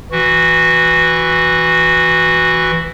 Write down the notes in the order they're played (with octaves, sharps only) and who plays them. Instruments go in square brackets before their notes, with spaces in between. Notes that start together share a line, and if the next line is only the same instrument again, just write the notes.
[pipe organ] E3 F#4